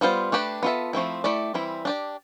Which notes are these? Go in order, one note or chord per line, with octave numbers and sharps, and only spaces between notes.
G3 B3 F4 C5
A3 D4 G4 B4
B3 F4 A4 E5
F3 A3 C4 E4
A3 E4 G4 D5
E3 G3 C4 E4
D4 G4 D5